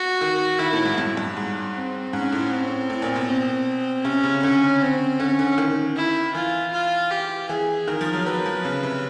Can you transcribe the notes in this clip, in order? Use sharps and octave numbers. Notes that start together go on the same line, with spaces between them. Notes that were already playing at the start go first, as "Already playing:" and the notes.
Already playing: F#4
D#3
D#3 E4
A2
G#2
G2
G2
G#2
C4
G#2 C#4
A2
C4
A2
A#2
B2
C4
C3 C#4
C#3
D3 C#4
C4
D3 C#4
D3
D#3
E4
E3 F4
F4
G4
E3 G#4
D#3 A#4
F3
F#3
F#3 B4
F3
C#3
C3